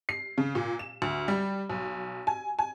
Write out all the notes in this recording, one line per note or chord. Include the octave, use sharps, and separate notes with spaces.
C7
C#3
A#2
E7
D2
G3
B1
G#5
G#5